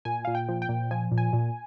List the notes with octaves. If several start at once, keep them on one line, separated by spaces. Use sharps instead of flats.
A#2 G#5
A#2 F5
G5
F3
G5
A#2
F3 G#5
A#2
G#5
A#2